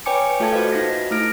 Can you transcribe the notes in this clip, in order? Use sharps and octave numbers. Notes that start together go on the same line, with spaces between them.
B4 C#5 G5 G#5 D6 C#7
A3 F4 A4 E5 A5 G#6
F4 F#4 B4 C5 D#5 F5
D#4 F4 F#4 A#6
A3 E4 F6 A#6 D7